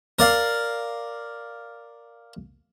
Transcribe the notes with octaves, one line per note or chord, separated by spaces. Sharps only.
A#4 D5 F5